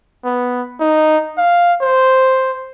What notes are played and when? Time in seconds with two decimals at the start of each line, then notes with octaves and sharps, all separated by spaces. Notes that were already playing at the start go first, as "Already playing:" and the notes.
0.24 B3
0.80 D#4
1.38 F5
1.81 C5